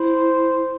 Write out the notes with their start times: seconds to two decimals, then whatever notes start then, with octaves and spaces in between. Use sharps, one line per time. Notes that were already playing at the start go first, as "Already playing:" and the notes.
Already playing: E4 C5